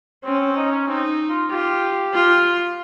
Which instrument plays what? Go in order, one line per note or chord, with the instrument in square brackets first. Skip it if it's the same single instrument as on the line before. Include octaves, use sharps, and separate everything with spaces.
[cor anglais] C4 [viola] C#4
[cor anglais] C4
D#4
C#4
[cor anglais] C4 [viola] D#4
[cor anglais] F4
[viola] F4 [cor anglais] G4
[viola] F4